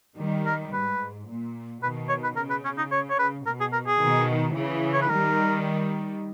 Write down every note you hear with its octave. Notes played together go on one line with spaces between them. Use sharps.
D#3 G3
A#4
G#2 B4
A#2
B2 D#3 B4
C#5
B4
C#3 A#4
B4
C#4
D#4
C#5
C#5
B4
B2 A#4
G#4
A#4
G#4
B2 D#3
C#3 E3
C#5
B4
D#3 G3 A#4